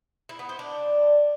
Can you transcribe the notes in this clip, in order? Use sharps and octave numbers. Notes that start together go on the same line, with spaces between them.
E4
B3
C5
D4